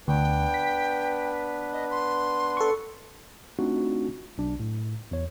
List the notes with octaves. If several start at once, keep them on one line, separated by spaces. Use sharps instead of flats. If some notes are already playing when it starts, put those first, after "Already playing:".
D2 B3 D4 B4 G5
B6
D#5
C6
A4 C#6
A3 C4 D4 D#4 F4 F#4
B1 D4
A2
E2 C#5